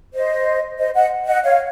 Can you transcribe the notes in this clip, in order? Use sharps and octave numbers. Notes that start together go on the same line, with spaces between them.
C5 D#5
C5 D#5
D#5 F#5
D#5 F#5
C#5 F5